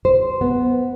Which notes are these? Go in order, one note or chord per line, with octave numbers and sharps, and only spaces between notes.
C5
B3